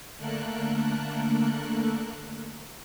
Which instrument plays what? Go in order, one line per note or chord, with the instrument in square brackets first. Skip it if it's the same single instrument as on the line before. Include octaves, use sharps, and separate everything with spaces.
[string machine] D3 A3 A#3 A4 A#4 F#6